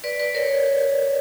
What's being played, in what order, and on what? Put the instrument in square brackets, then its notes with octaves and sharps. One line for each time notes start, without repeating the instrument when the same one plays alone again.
[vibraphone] B4 D5
B4 D5
A#4 C#5